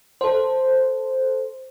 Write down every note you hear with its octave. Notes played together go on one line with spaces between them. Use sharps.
A4 C5